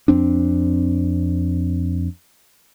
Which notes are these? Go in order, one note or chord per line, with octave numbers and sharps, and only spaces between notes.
F2 C4 D4